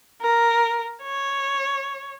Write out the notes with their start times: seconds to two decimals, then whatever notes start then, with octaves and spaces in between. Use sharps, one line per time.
0.22 A#4
1.03 C#5